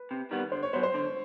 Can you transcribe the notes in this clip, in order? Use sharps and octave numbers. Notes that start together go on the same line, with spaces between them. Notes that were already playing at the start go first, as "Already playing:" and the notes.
Already playing: B4
C3
D#3 G3 B3
D3 C5
C#5
F#3 B3 C5
C5
D3